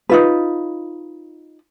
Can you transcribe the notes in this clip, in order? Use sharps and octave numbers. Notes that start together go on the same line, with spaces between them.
D#4 F4 B4